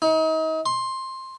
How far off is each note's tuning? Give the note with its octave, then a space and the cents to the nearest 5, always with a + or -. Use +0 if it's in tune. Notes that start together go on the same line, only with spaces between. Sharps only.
D#4 +35
C6 +10